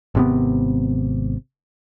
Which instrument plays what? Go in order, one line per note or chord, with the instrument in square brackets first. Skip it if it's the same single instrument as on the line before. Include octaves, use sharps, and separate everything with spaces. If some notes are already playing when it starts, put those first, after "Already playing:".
[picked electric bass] G#1 C3 B3